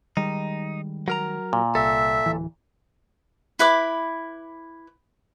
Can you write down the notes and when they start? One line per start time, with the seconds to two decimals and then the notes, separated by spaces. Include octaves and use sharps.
0.17 D#3 G3 G#3 D#4
1.08 F#3 A#4 A#5
1.53 A#2
1.75 C2 A4 E5
2.26 D1 E3
3.59 E4 B4 B5 D6